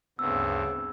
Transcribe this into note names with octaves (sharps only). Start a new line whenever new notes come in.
D2 G2 C#3 B3 C4 E6